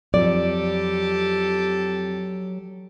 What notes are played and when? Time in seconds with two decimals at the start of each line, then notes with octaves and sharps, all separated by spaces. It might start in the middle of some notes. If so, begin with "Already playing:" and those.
0.14 F2 F#3 G4 A4 D5